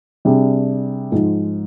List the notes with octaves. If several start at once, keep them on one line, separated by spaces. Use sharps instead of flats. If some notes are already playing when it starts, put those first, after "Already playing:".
C3 G3 D4 G#4
G#2 F3 G#3